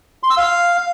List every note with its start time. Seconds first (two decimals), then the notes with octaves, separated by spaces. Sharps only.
0.23 C6
0.30 E6
0.37 F5